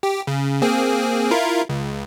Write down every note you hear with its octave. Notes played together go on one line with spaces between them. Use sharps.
G4
C#3
A#3 C4 G#4
E4 F4 A#4
C#2